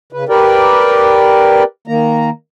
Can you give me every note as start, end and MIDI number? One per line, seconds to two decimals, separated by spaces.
0.13 0.25 49
0.13 0.25 71
0.29 1.63 67
0.29 1.63 70
0.29 1.63 71
0.29 1.63 74
0.29 1.63 79
1.87 2.30 51
1.87 2.30 58
1.87 2.30 82